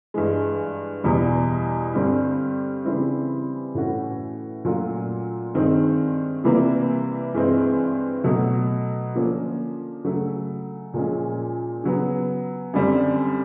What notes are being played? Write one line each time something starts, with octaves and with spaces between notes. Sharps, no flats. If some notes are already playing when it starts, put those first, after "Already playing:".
G2 E3 G#3
E2 B2 G3
G2 D3 G3 C4
C#3 E3 G3 C4 E4
A2 E3 A3 C#4 F#4
A#2 F#3 A3 C#4 F4
G2 D#3 G#3 C4
C3 E3 G3 A#3
G2 E3 G#3 C4
B2 F#3 A3
D3 F3 A#3 C#4
C#3 F#3 A3
A#2 F3 G#3 C#4
C#3 F#3 B3
F#2 D3 G3 C4